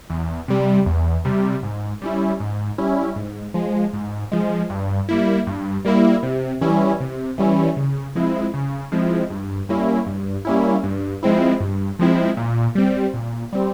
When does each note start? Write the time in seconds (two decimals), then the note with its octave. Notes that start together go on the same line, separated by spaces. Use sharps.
0.10 E2
0.48 C3 G3
0.86 E2
1.25 C3 G3
1.63 G#2
2.02 G3 C#4 E4
2.40 G#2
2.78 G3 C#4 E4
3.16 G#2
3.54 F3 G#3
3.93 G#2
4.32 F3 G#3
4.70 G2
5.09 G3 A#3 E4
5.47 G2
5.85 G3 A#3 E4
6.23 C3
6.61 E3 G3 C#4 E4
7.00 C3
7.38 E3 G3 C#4 E4
7.77 C#3
8.15 F3 G#3 C4 E4
8.54 C#3
8.92 F3 G#3 C4 E4
9.30 G2
9.69 G3 A#3 C#4 E4
10.06 G2
10.45 G3 A#3 C#4 E4
10.83 G2
11.23 F3 G#3 C4 E4
11.60 G2
11.99 F3 G#3 C4 E4
12.37 A#2
12.75 G3 C4
13.14 A#2
13.53 G3 C4